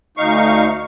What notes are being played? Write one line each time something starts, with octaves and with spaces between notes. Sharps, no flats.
D2 D#4 F5 C#6